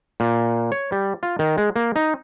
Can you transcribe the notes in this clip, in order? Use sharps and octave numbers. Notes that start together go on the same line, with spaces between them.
A#2
C#5
G3
F4
D#3
G#3
A#3
D#4